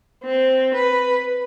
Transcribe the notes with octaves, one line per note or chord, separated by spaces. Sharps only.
C4
B4